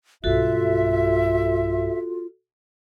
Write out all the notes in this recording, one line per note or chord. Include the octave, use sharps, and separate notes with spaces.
B1 G2 F4 F#4 A4 E5